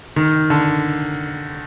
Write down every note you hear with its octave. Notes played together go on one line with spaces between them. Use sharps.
D#3
D3